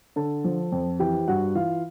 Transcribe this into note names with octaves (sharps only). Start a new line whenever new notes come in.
D3 A4 A5
F3
F2
E3 G4 G5
G2 F#4 F#5
E3 F4 F5